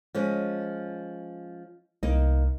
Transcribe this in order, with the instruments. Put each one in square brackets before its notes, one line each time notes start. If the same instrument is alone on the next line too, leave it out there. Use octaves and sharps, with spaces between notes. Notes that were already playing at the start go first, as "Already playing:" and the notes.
[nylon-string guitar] F3 G#3 C#4
[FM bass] C2 [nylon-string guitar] A#3 D#4